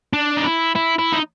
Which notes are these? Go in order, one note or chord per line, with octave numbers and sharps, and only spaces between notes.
D4
D#4
E4
E4
E4
D#4